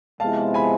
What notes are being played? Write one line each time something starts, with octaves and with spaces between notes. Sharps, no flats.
C3 F3 G#3 B3 E4 F5 A5
G#5 B5